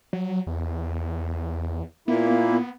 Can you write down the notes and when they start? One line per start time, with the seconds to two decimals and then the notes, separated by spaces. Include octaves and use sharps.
0.13 F#3
0.47 E2
2.08 A#2 A#3 B3 E4